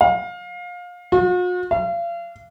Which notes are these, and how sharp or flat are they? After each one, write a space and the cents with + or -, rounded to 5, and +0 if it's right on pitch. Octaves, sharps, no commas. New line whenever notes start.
F5 +25
F#4 -45
F5 -35